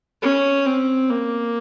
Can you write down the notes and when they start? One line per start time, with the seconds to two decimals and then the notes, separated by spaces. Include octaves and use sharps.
0.22 C#4
0.66 C4
1.10 A#3